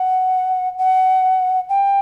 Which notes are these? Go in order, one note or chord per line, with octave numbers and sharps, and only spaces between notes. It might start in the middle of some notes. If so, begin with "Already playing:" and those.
Already playing: F#5
F#5
G5